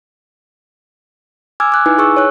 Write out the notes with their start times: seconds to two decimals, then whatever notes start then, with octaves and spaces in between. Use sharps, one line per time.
1.60 G#5 D6 E6 F6 G#6
1.72 D6 F#6
1.86 D#4 E4 B4 G#5
1.98 G#4 C#6 E6
2.17 C#5 F#6